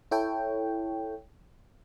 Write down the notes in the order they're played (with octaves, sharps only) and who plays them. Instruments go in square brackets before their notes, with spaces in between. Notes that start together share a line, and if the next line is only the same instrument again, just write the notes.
[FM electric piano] E4 A4 C#5 G5